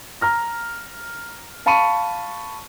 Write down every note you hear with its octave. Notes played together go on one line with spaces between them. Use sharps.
A#5 F6 A#6
F5 A5 B5 C#6 C#7 D#7